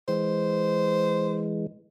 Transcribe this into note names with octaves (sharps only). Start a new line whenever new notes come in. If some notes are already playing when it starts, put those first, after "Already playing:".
E3 G#3 C5